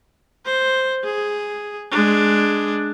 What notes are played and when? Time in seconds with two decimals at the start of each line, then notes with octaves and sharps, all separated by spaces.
0.46 C5
1.04 G#4
1.91 G#3 D4